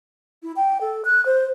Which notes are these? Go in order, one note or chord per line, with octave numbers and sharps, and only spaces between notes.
E4
G5
A4
F#6
C5